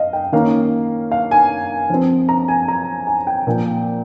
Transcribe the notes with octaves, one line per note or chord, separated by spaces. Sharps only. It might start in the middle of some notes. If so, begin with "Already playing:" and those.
Already playing: D#5 F5
G5
D#3 A#3 C#4 F5
F5
G#5
F3 C4
A#5
G#5
A#5
G#5
G5
A#2 F3 A#3